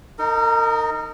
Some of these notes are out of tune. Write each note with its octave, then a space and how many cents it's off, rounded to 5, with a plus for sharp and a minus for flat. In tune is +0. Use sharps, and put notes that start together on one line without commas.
D#4 +0 A#4 -35